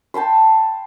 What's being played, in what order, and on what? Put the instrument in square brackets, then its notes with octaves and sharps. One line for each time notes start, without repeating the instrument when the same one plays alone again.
[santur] G5 A5 B5 C6